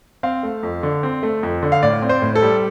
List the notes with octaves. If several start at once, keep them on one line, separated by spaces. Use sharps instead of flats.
C4 F5
A3
F2
D3
C4
A3
F2
D3
F5
A2 D5
C4
C5
A2
A4
G3